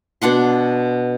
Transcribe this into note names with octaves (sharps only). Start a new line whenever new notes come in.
B2 D4 F#5 C6